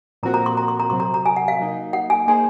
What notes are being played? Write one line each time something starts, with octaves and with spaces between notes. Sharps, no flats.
A#2 F3 C4 F#4 A#4 A#5
A#5
C6
A#5
C6
A#5
C3 F#3 C4 C6
A#5
A#5
G#5
F#5
F5
F#3 A#3 D#4
F#5
G#5
A#3 D#4 G#4 C5 G#5